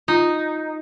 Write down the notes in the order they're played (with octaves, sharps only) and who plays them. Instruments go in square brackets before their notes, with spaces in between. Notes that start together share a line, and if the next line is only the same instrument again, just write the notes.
[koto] D#4 [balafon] F4